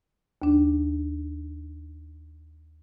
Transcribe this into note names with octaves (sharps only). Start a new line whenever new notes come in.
D#2 D4